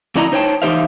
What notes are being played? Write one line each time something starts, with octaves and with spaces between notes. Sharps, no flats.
F2 D3 D4 E4 D#5 A#5
D#4 C5 C#5 E5 G5 A5
E3 D#4 G4 C5 E5 F5